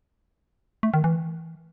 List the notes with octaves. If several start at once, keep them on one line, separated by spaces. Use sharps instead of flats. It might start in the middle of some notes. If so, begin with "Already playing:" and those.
A3
D#3
E3